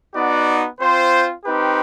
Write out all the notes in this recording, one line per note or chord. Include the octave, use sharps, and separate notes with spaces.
B3 D#4 F#4 D5
C4 F4 C5
C4 D#4 G4 B4